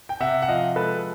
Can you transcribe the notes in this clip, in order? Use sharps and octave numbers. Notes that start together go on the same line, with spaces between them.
G5
C3 E5 F#5
F#5
F3 D#5 F5
G#3 A4 B4